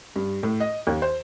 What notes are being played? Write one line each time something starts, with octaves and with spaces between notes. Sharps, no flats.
G2
A2
D#5
D#2
C5